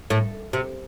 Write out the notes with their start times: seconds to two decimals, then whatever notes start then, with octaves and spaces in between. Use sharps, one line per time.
0.10 A2
0.53 C3